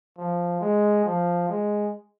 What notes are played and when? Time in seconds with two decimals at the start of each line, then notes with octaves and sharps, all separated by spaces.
0.18 F3
0.61 G#3
1.05 F3
1.49 G#3